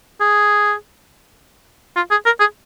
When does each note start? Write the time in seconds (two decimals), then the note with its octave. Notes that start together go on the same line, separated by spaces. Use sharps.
0.20 G#4
1.96 F4
2.11 G#4
2.25 A#4
2.40 G#4